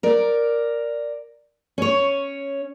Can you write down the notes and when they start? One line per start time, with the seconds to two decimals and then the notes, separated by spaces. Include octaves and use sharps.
0.03 A#4 D5
1.78 C#4 C#5